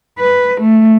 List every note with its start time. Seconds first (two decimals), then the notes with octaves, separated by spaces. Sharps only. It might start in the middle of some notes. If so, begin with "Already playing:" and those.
0.19 B4
0.61 A3